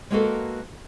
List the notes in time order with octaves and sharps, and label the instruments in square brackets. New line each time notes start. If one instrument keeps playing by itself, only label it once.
[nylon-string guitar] G#3 A#3 B3 F#4 A4 A#4